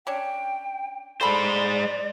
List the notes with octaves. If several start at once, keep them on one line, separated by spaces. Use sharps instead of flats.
C#4 D4 G5
G#3 A4 C5 D5 G#5 B5